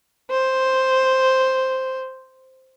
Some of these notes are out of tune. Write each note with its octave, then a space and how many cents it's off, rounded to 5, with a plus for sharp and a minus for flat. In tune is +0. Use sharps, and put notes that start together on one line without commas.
C5 +0